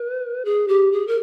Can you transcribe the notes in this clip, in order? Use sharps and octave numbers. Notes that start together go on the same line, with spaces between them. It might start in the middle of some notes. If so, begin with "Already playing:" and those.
Already playing: B4
G#4
G4
G#4
A#4